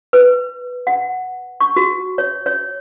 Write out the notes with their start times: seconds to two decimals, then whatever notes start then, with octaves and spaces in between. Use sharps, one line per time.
0.13 B4
0.87 F#5
1.61 C#6
1.76 F#4
2.18 C#5
2.46 C#5